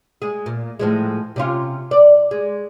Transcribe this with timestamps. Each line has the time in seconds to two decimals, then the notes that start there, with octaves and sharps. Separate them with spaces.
0.22 G#3 G#4
0.46 A#2
0.79 A2 F3 G#3
1.36 C3 C#4 F4
1.91 D5
2.31 G#3